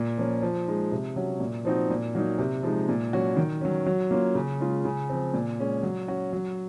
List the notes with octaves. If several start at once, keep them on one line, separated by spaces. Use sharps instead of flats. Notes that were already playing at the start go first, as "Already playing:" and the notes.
Already playing: A#2
F3 A#3 C#4
F3
G#3 D#4
C3
F#3 C#4 F#4
A#2
F3 C4 D#4 F#4
A#2
F#3 A#3 D#4
C3
F3 G#3 D#4
A#2
F#3 C#4 F#4
D#3
F#3 C#4
F#3
A#3 C#4 F4
C#3
G#3 C#4 F4
C#3
F3 C4
A#2
G#3 C#4
F#3
C#4 F#4
F#3